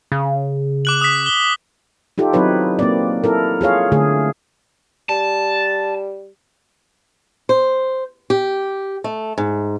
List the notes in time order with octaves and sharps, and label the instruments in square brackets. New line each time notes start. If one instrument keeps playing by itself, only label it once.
[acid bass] C#3
[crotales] D6 F#6 F#7
D#6 B6
G7
[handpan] D#4 F4 G4 A4
F#3 C4 D#4 E4 B4 C#5
A#3 C4 D5
E4 A4 A#4
F4 G#4 C#5 F5
D3 A3 G#4
[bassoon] G3 [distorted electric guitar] A5
[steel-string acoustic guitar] C5
G4
A3
G#2